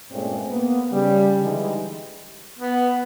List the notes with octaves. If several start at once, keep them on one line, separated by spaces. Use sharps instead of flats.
G2 A#2 G#3 A3 C4 C#4
A#3 B3
C#3 G3
D3 E3 G3 G#3 D#4 G4
B3